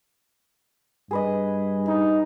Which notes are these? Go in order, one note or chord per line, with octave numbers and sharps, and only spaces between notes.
G2 G#4 B4 D#5
D#4